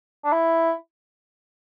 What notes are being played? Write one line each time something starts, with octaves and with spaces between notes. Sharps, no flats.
D4
E4